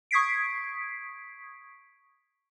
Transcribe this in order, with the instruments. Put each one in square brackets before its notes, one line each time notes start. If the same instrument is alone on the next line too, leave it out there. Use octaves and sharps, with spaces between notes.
[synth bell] C#6 D#6 G#6 B6 C7 D7